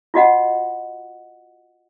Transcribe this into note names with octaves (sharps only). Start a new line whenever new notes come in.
F4 F#4 D#5 F#5